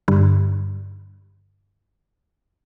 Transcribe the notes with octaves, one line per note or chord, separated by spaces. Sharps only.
G2 D3